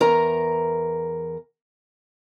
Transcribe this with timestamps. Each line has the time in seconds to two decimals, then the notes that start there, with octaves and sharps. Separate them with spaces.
0.01 E2 A#4 A#5